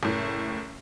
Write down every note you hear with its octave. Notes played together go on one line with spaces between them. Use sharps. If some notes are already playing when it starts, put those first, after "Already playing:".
F#1 A2